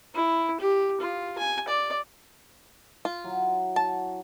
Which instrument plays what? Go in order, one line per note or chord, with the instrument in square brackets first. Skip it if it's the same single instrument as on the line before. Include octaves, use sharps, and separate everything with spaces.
[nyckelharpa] E4
G4
F4
G#5
D5
[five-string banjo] F4
[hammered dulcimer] F#3 E4
[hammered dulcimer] F#4 [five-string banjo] A5